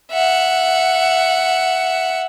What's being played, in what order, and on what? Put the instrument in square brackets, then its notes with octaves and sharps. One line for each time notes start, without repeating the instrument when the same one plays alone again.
[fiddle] E5 F#5